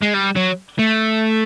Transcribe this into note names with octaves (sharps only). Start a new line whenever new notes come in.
G#3
G3
F#3
A3